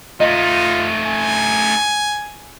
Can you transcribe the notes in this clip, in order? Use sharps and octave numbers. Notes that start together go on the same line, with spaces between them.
A3 D#4 F4 D#5
G#5